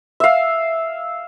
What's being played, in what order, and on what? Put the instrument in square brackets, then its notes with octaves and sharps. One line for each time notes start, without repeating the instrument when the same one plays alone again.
[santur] E5 F5